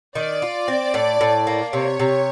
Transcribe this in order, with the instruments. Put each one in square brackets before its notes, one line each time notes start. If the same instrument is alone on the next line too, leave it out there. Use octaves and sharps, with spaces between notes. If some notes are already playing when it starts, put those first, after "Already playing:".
[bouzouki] D#3 [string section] D5
[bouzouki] F4
C4
A2
A2
A#3
[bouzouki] C3 [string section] C#5
[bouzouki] C3